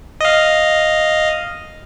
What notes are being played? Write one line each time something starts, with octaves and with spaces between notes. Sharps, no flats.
D#5 F5